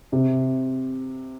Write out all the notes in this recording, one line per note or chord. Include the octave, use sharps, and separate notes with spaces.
C3